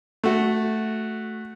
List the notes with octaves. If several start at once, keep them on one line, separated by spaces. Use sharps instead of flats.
A3 F#4